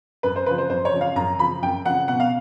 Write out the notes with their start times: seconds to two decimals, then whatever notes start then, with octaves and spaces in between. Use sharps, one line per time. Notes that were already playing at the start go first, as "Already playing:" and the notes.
0.23 F#2 B4
0.36 C5
0.46 C#3 F3 B4
0.58 C5
0.70 F#2 C5
0.85 C#5
0.93 C#3 F3
1.01 F5
1.16 F#2 A#5
1.39 C#3 F3 B5
1.62 F#2 G5
1.85 C#3 F3 F#5
2.08 B2 F#5
2.20 F5